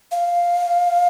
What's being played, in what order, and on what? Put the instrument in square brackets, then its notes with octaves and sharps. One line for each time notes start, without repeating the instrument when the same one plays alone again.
[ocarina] F5